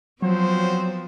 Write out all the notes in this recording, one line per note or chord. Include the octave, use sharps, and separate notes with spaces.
F3 F#3 B3 C4 F#4 C5